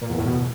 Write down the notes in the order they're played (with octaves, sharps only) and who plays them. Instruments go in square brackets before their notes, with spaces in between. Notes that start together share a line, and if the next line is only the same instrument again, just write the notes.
[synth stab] A#2
E2
A2
B2